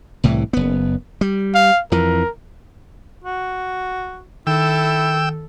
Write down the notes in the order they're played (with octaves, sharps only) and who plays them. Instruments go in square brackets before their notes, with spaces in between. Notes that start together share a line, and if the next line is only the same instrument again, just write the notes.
[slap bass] C2 A2 E3
F#1 B3
G3
[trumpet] F5
[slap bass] F2 E3 [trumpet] A#4
[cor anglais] F#4
[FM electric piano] D#3 [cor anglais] E4 [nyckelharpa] A4 [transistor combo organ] G5 E6